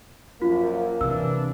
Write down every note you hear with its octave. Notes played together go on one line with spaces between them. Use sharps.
F#2 F3 A#3 F4
C3 E3 D4 E6